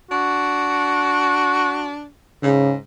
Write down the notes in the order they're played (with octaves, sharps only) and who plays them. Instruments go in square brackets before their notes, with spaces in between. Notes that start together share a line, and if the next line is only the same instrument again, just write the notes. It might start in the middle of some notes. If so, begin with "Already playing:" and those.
[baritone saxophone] D4 [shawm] F#4
[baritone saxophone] G#2 [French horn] C#3